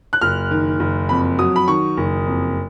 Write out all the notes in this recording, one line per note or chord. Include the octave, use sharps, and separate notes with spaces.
F#6
F#1 F6
D#3
F#1
F2 B5
F#3 D#6
B5
D#3 C#6
F#1
F2